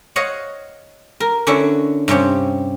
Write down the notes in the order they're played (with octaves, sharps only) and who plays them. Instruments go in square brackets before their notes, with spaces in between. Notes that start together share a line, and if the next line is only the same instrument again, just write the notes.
[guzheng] C#5 D#5 F5 F#5
A#4
D3 C#4 D4 E4 F#4 C#5
G2 C3 C#4 G4